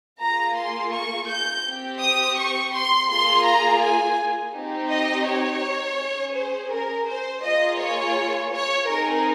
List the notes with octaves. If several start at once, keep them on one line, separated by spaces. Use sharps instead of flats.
A#3 F4 G#4 A#5
C6
C#6
G6
C4 G4
D#6
C#6
C6
A#3 F4 G#4 C6
A#5
G#5
C4 D#4 G4
D#5
C#5
C#4 G#4
C5
A#4
C5
A#3 F4 G#4 D#5
C#5
C#5
C4 D#4 G#4 A#4